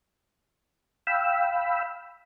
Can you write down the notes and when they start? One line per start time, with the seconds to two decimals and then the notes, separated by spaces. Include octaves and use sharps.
1.07 F5 G5 B5 E6